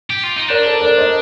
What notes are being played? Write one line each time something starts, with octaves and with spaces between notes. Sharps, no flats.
G4
F4
D#4
D4 A#4 D5
A4 C5
A#4 D5
C5 D#5